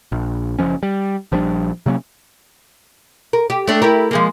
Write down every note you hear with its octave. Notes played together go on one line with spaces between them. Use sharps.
A#1
F#1 F2 F3 C#4
G3
A#1 F3 G3 D4
C3 F#3 A#3 C#4
A#4
G4
A3 D4 G4
E4 G4 A#4
F3 G#3 A#3